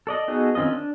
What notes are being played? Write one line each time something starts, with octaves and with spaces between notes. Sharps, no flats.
A4 D5 D#5
B3 D#4 F#4 G#4 A4
D#3 C4 C#4 F4 D#5
D4